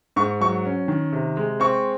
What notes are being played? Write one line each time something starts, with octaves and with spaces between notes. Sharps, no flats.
G#2 C#6
F#3 C#6
C#4
D#3
C3
G#3
C4 C#6